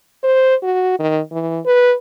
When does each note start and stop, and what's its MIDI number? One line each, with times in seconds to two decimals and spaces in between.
0.23 0.55 72
0.63 0.95 66
0.99 1.20 51
1.32 1.60 52
1.66 1.95 71